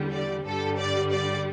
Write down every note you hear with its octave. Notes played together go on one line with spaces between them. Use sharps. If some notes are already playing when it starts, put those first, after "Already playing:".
Already playing: E2 D3 G3
D5
G2 D3 G3 A4
D5
D5